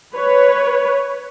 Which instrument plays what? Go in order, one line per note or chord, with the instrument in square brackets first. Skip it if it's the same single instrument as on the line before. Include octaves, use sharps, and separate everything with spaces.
[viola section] B4 C#5